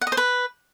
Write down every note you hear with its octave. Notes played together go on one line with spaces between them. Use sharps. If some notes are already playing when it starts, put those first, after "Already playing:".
F#5
D#5
C5
B4